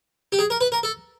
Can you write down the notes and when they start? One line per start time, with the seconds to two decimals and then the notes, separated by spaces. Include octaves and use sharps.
0.32 G4
0.39 G#4
0.50 A#4
0.61 B4
0.72 A#4
0.83 A4